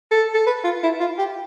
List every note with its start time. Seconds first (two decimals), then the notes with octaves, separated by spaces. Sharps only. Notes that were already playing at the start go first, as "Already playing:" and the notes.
0.11 A4
0.34 A4
0.46 B4
0.64 F4
0.83 E4
1.00 F4
1.18 G4